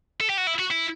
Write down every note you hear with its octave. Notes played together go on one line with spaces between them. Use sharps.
A4
G4
F#4
E4
F#4
E4